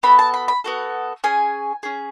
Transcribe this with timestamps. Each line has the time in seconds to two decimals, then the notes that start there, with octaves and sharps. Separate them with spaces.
0.03 B3 F#4 A4 B5
0.19 A5
0.34 B5
0.48 B5
0.64 B3 F#4 A4
1.24 C#4 G#4 G#5
1.83 C#4 G#4